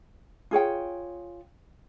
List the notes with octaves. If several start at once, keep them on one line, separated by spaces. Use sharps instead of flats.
F4 G#4 C#5 G5